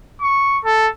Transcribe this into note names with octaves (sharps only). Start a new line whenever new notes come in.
C#6
A4